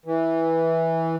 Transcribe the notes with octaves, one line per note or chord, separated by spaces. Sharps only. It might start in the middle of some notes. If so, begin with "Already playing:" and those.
E3